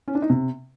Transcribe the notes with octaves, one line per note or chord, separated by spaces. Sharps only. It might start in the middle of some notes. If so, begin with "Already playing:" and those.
C#4
D4
D#4
C3